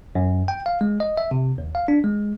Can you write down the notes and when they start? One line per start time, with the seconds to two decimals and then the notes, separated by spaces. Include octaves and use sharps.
0.15 F#2
0.48 G5
0.66 F5
0.81 G#3
1.00 D#5
1.17 E5
1.31 C3
1.58 D#2
1.75 F5
1.88 D4
2.04 G#3